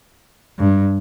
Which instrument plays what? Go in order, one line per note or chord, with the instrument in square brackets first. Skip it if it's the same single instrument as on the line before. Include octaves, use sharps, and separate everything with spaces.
[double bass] G2